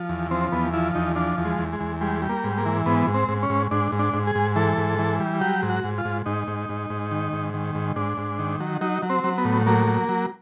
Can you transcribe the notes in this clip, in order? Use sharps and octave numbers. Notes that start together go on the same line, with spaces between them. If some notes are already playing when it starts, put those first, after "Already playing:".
Already playing: F3
E2
F3 C4
E2 B3
F3 E4
E2 D#4
F3 D4
E2
G#3
E2
G#3
E2
G3 G#3
G3
A#3
G#2
A#3
E3
G#2 B3
G#2
C4
G#2
C#4
G#2
G#2 D4
G#2
D4
G#2
G#4
G#2
E3 A4
G#2
E3
G3
F#3 G4
G#2
F#4
G#2
F4
G#2
G#2 D#4
G#2
G#2
G#2
D#3
G#2
D#3
G#2
G#2 D4
G#2
D#3
F#3
F#3 D#4
F#3
C4
F#3
B3
A2
F#3 A#3
F#3
F#3